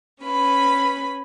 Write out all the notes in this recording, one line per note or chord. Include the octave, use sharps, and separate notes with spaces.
C#4 B4 B5